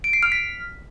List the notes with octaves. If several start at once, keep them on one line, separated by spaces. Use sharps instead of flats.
D7
C7
F6
B6